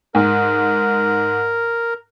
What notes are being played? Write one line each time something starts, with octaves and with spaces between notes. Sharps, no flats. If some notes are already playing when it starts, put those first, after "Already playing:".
G#2 A#4